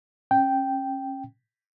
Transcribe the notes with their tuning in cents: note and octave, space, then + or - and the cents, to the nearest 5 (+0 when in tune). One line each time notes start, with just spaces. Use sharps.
C#4 -30 G5 -5